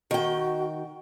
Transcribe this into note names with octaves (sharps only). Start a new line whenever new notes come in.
D#3 F#4 G5